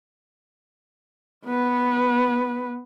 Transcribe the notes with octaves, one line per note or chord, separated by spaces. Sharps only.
B3 B4